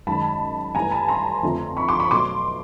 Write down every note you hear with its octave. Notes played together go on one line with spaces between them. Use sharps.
F#2 D#3 G#3 A5 B5
G2 E3 A3 G#5 A#5
A5 B5
A#5 C6
F2 D3 F3 A3
B5 C#6
C6 D6
B5 C#6
B2 F#3 A3 C6 D6